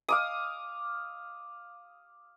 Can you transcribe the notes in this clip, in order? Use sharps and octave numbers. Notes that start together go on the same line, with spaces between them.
F5 D6 D#6